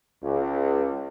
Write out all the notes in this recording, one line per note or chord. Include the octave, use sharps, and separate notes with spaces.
C#2